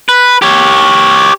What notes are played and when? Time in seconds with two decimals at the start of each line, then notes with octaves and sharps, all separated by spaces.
0.09 B4
0.42 G4 C#5